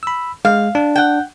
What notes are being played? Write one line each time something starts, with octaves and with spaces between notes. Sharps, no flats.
B5 E6
G#3 F5
D4
F#5 G5